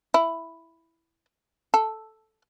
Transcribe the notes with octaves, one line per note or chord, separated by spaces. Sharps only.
E4
A4